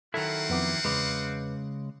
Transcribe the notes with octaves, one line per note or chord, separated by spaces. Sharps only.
D#3 F#3 C4 E4 F4 A4 F#5
F2 B3 D6
E2 C#3 G#3 B4 D6